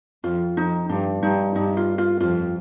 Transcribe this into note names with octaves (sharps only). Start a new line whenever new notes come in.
F2 F4
F2 D#4
G2 D4
G2 D#4
G2 D#4
F4
F4
F2 F4